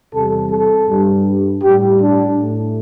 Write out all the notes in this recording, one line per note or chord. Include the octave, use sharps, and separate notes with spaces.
E2 C3 G3 A4
A4
G2 G3
A2 G3 G4
D4
A2 A3